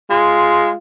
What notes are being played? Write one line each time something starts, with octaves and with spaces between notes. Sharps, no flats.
G#3 F4